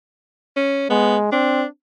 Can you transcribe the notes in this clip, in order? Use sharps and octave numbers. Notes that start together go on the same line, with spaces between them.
C#4
G#3 B3
C4 D4